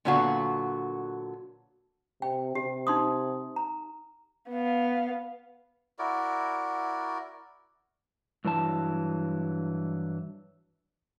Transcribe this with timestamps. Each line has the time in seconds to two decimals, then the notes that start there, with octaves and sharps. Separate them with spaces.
0.05 A#2 D3 F#3 B3 F#4 F5
2.22 C3 G5
2.55 C3 G4
2.87 D#4 C6 D#6
3.56 A#5
4.50 B3 F5
5.99 E4 F#4 A#4 D5
8.45 G2 E3 F#3 A5